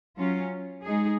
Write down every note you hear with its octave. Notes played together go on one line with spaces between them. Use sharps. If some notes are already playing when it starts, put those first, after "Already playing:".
F#3 C#4 F4
G#3 D#4 G#4